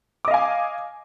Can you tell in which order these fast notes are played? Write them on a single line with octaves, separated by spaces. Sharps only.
D6 D#5 F5 G#5